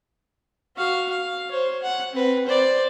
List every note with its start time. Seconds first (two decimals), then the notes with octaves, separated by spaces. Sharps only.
0.77 F#4 F5
1.10 F5
1.51 C5 C#5
1.82 F#5
2.13 C4 B4
2.46 C5 D5